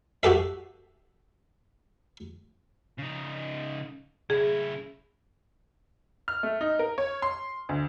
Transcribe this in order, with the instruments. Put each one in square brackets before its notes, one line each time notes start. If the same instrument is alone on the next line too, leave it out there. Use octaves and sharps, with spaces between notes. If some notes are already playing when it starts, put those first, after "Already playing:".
[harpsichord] F#4 G4 A4 E5
[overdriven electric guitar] C#3 D#4
[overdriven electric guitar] C#3 E4 [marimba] G#4
[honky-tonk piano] F6
A3
D#4
A#4
C#5
C6
D2